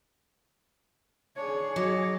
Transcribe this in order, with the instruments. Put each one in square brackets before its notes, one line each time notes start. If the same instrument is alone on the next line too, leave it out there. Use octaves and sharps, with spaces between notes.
[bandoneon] D4 [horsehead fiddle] G#4 C#5
[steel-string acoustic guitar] F#3 [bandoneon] D#5 D6